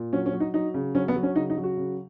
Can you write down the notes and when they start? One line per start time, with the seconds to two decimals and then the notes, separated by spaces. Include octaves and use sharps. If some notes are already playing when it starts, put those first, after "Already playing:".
Already playing: A#2
0.13 F#3 C#4
0.26 C#4
0.33 F#3
0.40 D#4
0.54 F#3 D#4
0.74 C#3
0.95 F#3 C#4
1.08 B3
1.16 F#3
1.23 C#4
1.36 C#3 D#4
1.50 D#4
1.57 F#3
1.64 F#4
1.77 C#3